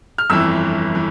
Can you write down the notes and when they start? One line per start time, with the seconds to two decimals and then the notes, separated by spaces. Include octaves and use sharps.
0.18 F6
0.30 G1 F2 E3 E6
0.95 E3